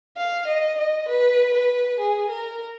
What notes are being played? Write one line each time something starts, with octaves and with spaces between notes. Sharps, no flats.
F5
D#5
D#5
B4
B4
G#4
A#4